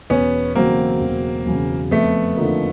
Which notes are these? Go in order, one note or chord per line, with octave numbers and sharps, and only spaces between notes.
E1 B3 C#4
E2 C#3 F#3 A#3 C4
E1
E2 C#3 F#3
F2 A3 B3
D3 F3 A#3 D#4